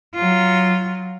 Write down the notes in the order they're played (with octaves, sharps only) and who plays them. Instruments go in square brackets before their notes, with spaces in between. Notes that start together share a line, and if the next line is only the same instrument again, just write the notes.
[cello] F#3 F4